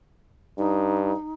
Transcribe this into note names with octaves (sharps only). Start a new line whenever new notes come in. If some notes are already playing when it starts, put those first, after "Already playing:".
G2 D#4